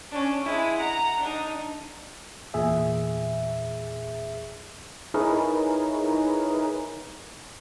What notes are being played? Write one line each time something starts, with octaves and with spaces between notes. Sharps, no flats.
C#4 D4
G#3 E4
F#5 A#5
D4 D#4
E2 A#2 G#4 E5
D#4 E4 G#4 A#4 B4 C#5